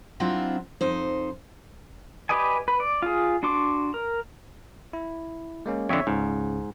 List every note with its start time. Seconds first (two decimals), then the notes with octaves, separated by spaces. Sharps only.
0.20 F#3 C4 D4 E4 F4
0.81 F2 D#4 C5
2.29 G4 B4 D5 D#5 G#5
2.68 B4
2.80 D5
3.02 F4 G#4
3.43 D4 F#4 C6 D6
3.94 A#4
4.93 E4
5.66 G#3 A#3 C#4
5.89 F2 D3 C#5 E5
6.07 C#2 G#2 C#3